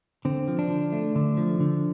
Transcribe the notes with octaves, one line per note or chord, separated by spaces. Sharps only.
D3 C4
F3
D4
D3
A3
D3
F3
D3